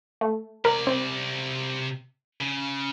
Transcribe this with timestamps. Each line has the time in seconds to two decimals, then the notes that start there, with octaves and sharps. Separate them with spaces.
0.21 A3
0.65 C3 A#4 D5
0.87 C4
2.41 C#3